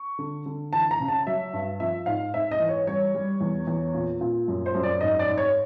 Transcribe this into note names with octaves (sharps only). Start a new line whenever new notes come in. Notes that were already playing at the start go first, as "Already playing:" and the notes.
Already playing: C#6
D3
D3
E3 A5
A#5
C#3
A5
F#3 E5
G2
F3 E5
G#2 F5
G#2 E5
D#5
E3
C#5
G3 C#5
G3
E2
E2
A#2
A#2
F#2
C5
F#2
D5
G#2 D#5
D5
G#2
C#5